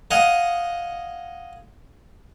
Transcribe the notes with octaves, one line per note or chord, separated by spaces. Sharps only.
D#5 F5 F#5 G#5